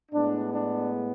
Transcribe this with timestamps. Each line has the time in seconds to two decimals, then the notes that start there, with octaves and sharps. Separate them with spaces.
0.12 A2 G#3 B3 D4
0.52 D4